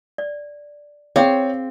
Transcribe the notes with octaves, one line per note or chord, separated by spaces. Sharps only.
D5
C4 G#4 C#5 F5 G5